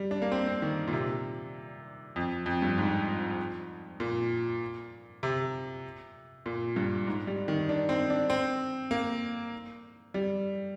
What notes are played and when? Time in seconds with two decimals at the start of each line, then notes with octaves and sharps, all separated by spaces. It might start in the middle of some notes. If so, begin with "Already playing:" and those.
Already playing: G3
0.11 D4
0.22 A#3
0.32 C4
0.47 C4
0.62 D#3
0.88 A#2
0.93 C3
2.16 F2
2.46 F2
2.62 G2
2.78 G#2
4.00 A#2
5.23 C3
6.46 A#2
6.76 G2
7.07 G#2
7.27 G3
7.48 D#3
7.69 D4
7.89 C4
8.10 D4
8.30 C4
8.91 A#3
10.14 G3